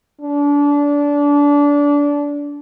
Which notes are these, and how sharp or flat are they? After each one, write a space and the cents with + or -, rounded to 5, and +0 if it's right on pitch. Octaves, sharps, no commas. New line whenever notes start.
D4 -25